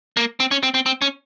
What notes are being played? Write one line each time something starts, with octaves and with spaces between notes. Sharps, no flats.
A#3
C4
C#4
C4
C4
C4
C#4